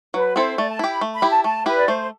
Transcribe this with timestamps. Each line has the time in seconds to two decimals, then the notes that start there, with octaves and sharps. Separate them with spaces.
0.14 F#3 B4
0.36 C4 E4 A4 C5
0.58 A3 D5
0.68 A5
0.79 E4 G4
0.90 B5
1.01 A3
1.15 B5
1.22 E4 G4
1.30 A5
1.44 A3 A5
1.66 E4 G4 B4
1.77 D5
1.87 A3 C5